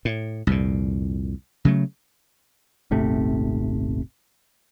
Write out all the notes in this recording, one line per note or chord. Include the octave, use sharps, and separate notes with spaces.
A2
C2 F2 A#2
C#3 F#3 A3
D#1 G#1 C3 A3